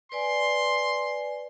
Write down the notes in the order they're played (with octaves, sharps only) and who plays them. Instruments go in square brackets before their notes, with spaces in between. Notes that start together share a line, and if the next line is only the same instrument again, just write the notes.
[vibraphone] B4 D5 G#5 [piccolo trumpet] C6